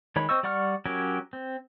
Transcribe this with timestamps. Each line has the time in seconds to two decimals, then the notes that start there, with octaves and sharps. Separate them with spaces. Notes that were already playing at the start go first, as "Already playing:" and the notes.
0.16 D#3 G#3 C#5 B5
0.29 C4 C5 D#5 C#6 E6
0.43 G3 D5 F#5 C#6 F6
0.86 F#3 C#4 G4 A#4
1.33 C4